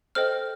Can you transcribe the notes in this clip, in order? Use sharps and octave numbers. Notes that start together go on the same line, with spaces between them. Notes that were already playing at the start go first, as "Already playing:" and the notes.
A4 C5 D#5 G5 F6